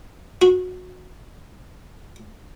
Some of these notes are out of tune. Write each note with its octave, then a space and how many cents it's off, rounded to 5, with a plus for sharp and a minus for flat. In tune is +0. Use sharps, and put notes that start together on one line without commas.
F#4 -20